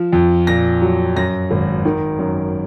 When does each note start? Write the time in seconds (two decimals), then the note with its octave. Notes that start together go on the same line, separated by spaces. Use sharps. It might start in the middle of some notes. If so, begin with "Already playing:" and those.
Already playing: F3
0.13 F2
0.47 A#2 A#6
0.82 F#3
1.16 F#2 A#6
1.51 G#1
1.85 D#3
2.19 F#2